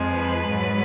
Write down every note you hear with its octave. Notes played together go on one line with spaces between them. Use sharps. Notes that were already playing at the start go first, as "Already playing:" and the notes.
Already playing: F2 F3 G#3
B4
G#2 F#3